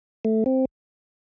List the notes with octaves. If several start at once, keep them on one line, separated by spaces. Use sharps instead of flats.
A3
C4